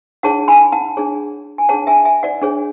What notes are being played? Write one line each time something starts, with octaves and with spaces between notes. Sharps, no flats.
D4 G#4 C#5 F#5 A5
G#5 B5
F#5 A5
D4 G#4 C#5
G#5
D4 G#4 C#5 F#5 A5
E5 G#5
E5 G#5
D5 F#5
D4 G#4 C#5